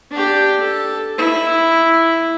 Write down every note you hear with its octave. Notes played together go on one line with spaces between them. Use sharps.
D4 G4
A4
E4